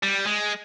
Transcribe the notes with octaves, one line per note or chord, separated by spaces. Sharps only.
G3
G#3